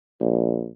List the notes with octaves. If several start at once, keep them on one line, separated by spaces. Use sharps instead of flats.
A#1